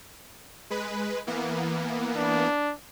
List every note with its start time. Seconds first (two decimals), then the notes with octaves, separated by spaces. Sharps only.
0.70 G#3 B4
1.27 E3 A#3 B3
2.16 D4